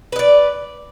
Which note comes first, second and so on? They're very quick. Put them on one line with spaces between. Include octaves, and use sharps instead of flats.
B4 D#5 D5